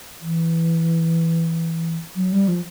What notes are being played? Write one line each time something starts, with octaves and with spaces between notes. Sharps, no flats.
E3
F#3
G3
F3